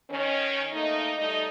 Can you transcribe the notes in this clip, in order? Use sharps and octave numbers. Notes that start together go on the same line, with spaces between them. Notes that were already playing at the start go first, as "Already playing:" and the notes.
D#3 C#4
A3 A#3 D#4
G3 A3 D#4